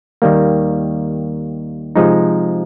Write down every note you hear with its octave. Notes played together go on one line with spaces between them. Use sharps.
D#2 D#3 G3 A#3
C3 F3 G#3 D#4